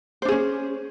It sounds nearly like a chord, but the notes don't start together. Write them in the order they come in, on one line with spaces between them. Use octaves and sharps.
C5 D4 G#4 C#4